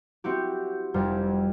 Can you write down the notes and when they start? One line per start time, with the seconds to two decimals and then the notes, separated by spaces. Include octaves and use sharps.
0.24 C4 E4 F#4 G4
0.94 F1 F2 G3 F4